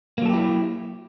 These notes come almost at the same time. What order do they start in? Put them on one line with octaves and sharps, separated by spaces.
A#3 F#3 A4 G4 E4